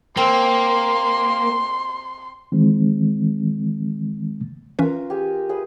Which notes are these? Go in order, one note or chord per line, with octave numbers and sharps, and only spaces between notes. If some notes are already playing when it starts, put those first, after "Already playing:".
A#3 C4 C6
D#3 E3 G#3 C4
E3 C#4 F4 A#4 B4
G4 G#4 G#5
G#4 B4 E5